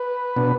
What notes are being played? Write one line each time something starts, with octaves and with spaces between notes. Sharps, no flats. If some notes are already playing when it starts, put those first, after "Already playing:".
Already playing: B4
B2 B3 D4